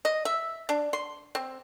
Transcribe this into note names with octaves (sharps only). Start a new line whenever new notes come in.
D#5
E5
D4
C6
C4